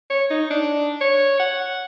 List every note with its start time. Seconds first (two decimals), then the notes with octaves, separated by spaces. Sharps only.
0.10 C#5
0.30 D#4
0.51 D4
1.01 C#5
1.40 F#5